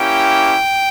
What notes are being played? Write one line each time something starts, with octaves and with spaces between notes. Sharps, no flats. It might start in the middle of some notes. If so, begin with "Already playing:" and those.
Already playing: A#3 C#4 E4 G4 G5